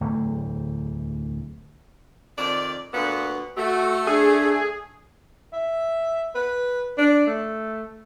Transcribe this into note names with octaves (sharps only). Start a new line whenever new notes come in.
D1 E2 A3
F2 D#3 D5
D2 A#2 B3
A3 F#4
D4 G#4
E5
B4
D4
A3